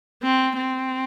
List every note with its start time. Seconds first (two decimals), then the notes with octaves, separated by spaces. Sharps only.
0.23 C4
0.57 C4